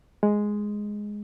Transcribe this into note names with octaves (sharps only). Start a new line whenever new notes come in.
G#3